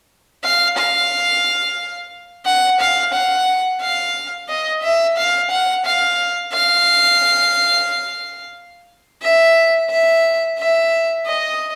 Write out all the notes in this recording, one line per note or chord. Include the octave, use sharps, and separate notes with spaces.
F5
F5
F#5
F5
F#5
F5
D#5
E5
F5
F#5
F5
F5
E5
E5
E5
D#5